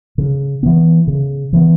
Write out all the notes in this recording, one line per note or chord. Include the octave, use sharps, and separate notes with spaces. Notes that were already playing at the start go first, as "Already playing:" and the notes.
C#3
E3 B3
C#3
E3 B3